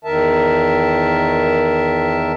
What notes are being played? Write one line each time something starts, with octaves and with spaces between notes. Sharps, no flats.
E2 D#3 A#4 E5 A5